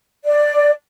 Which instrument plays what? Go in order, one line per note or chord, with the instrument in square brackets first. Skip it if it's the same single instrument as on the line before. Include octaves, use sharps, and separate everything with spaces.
[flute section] D5